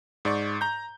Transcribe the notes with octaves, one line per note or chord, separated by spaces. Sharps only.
G#2 D5 C#6
A#5 G6